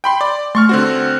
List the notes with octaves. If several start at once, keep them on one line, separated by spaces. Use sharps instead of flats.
G5 B5 C6
D5
A3 C6 C#6 F6
D3 C4 F#4